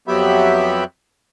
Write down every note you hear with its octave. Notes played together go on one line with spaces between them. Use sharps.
F2 F#3 B3 G4 E5 B5